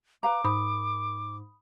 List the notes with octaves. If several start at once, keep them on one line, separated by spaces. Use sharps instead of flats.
B4 F5 A#5 D6
G#2 A#4 B5 D#6